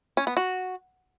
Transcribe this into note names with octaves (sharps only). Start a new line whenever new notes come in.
C#4
B3
F#4